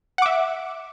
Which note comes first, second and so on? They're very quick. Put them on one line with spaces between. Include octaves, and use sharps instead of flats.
F#5 D6 E5